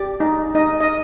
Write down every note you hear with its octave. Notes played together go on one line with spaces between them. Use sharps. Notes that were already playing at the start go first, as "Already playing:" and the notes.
Already playing: G4 D5
D#4
D#4 D#5
D#5